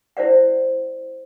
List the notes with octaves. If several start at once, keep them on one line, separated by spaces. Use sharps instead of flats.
E4 C5 D5 F#5